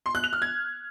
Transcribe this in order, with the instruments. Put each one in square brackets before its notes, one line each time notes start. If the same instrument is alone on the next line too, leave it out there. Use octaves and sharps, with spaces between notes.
[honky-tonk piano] C6
F#6
F7
F6
G#6